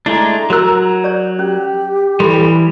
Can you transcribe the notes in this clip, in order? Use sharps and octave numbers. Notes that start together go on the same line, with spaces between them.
G#3 A3 D4 E4 A#5
F#3 F#4 A#4 E6 F#6
C#5 D5
C#4 G4
E3 G3 A4 B5 C6